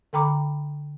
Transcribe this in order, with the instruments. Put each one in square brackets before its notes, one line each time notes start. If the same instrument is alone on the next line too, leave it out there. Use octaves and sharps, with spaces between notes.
[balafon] D3 A4 G5 A#5 B5 D6